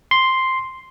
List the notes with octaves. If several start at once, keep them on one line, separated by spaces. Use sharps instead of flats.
C6